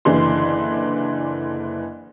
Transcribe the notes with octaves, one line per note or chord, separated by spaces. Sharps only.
F#1 D3 E3 D4 C6